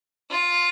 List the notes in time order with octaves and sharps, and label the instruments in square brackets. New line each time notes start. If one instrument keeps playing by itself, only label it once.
[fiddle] F4